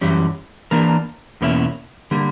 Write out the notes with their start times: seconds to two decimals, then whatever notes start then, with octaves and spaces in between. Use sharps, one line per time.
0.01 F#2 E3 G3 C#4
0.71 E3 A#3 D4 A#4
1.41 E2 B2 A#3 C#4 E4
2.11 D3 G3 A#3